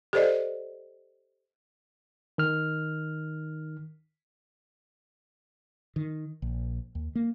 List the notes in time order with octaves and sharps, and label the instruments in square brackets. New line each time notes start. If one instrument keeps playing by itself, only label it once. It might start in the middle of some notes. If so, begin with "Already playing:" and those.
[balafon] G4 A4 C5 D5 D#5
[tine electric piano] D#3 F6
[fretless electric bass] D#3
A#1
D#2
A#3